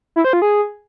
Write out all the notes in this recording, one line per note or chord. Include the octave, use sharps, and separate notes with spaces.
E4
C5
F4
G#4